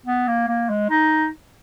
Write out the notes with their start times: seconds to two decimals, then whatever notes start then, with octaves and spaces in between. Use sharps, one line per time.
0.06 B3
0.28 A#3
0.48 A#3
0.70 G#3
0.90 D#4